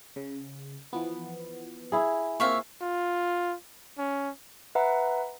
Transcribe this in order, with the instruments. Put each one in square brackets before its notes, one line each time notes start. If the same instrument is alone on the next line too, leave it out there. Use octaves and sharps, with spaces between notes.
[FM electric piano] C#3
E3 F3 B3
[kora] E4 G#4
[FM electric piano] A#2 A#3 C4 [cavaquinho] C#5 E5 F5
[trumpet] F4
C#4
[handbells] B4 E5 F#5 A#5